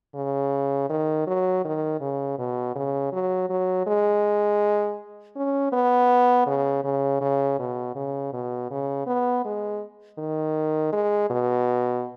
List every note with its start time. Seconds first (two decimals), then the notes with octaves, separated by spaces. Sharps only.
0.15 C#3
0.90 D#3
1.27 F#3
1.65 D#3
2.01 C#3
2.39 B2
2.76 C#3
3.13 F#3
3.50 F#3
3.87 G#3
5.36 C#4
5.73 B3
6.47 C#3
6.84 C#3
7.21 C#3
7.59 B2
7.96 C#3
8.33 B2
8.71 C#3
9.07 B3
9.45 G#3
10.18 D#3
10.93 G#3
11.30 B2